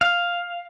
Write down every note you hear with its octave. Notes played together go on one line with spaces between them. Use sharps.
F5